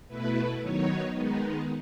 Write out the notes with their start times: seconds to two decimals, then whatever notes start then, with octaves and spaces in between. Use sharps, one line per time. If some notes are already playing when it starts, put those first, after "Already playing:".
0.08 B2 A3 E4 B4
0.61 D#3 F#3 B3 D#4 C#5
1.14 D#3 G#3 B3 D#4